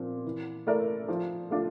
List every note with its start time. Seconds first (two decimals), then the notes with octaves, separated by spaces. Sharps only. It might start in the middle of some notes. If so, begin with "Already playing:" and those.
Already playing: A#2 F3 C4
0.25 E3
0.67 A3 E4 A#4 D5
1.08 F3
1.50 A3 D4 F4